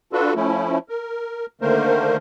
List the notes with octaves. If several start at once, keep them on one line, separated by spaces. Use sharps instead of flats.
D4 F4 F#4 A4 B4
F3 A3 C#4 E4
A#4
D3 D#3 A3 A#3 A#4 C5